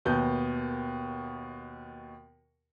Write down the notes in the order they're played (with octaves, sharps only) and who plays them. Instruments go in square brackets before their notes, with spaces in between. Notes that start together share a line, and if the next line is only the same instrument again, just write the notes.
[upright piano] D#2 B2 B3 G6